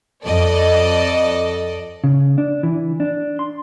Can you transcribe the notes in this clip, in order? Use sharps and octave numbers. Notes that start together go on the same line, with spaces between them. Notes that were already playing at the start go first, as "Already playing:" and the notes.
F2 A4 D5 D#5
C#3
D4
E3
D4
C6